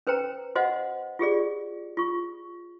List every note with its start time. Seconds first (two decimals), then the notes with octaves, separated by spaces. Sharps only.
0.07 C#4 B4 C5 G5 A#5
0.55 F#4 C5 D#5 F5 F#5
1.19 F4 G4 G#4 D5
1.97 F4 C#6